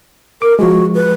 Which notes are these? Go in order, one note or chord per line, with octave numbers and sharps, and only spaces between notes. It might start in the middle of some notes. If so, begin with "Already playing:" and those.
A#4 D6
F3 G#3 F#4
B4